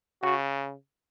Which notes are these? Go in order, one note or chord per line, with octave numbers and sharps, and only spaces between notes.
C#3 F#4